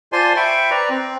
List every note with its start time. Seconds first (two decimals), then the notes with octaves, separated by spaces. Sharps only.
0.13 F4 C5 D5 G#5 A5 C6
0.36 C5 E5 G5 B5 C#6
0.70 B4 D5 A#5
0.89 C4